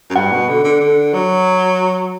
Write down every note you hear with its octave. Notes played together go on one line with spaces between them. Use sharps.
F#2
G2 F#5
B2
D3
D3
D3
F#3